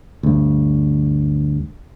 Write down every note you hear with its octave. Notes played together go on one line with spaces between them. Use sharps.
D2 G2